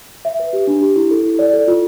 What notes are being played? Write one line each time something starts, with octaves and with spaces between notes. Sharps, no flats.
E5
B4
G4
D4
G4
E4
A4
E4
D5
A4
F4